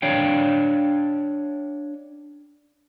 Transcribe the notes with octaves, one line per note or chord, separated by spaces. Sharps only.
D4 C#5 F5 G5